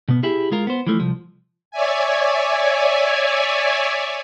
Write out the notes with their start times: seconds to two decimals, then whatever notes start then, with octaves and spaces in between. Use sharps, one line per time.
0.08 B2 B3
0.23 E4 G4 G#4
0.52 G#3 F4 A#4
0.67 B3 C5
0.87 E3 F3 A3
0.99 C2 F3
1.71 C#5 D5 E5 G#5